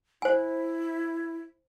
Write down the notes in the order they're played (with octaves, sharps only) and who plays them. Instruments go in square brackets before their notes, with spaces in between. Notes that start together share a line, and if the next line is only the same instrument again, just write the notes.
[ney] E4 [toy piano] C5 G#5